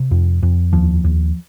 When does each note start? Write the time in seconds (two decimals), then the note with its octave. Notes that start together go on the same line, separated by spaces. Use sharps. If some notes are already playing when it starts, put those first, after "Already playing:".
Already playing: C3
0.11 F2
0.43 F2
0.73 D#2 F3
1.04 D#2